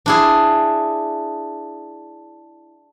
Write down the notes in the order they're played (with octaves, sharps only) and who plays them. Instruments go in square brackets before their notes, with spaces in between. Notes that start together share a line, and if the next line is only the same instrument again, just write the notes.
[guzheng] D4 E4 G#4